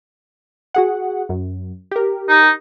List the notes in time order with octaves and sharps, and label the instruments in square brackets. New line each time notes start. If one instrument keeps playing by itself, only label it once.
[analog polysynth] F#4 G#4 F#5
F#2
G4 A#4
[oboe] D#4